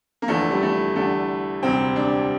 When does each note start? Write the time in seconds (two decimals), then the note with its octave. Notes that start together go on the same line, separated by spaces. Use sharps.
0.22 A#3
0.28 F1 E2 D3 F3 A3
0.51 G3
0.63 A3
0.96 E2 D3 G3 A3
1.63 E1 D2 C3 G3 C4
1.96 D4